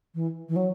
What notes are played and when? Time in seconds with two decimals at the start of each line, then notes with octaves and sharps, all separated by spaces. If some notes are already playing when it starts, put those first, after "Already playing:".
0.14 E3
0.48 E3
0.56 F#3